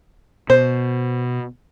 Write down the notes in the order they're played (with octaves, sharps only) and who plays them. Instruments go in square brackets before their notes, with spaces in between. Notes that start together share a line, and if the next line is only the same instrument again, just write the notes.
[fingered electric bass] B2 [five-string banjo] C5